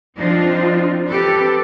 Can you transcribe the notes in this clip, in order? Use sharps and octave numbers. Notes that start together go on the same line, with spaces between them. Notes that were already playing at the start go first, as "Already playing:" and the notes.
F3 C4 D4 D#4 F4
C4 G4 A4 B4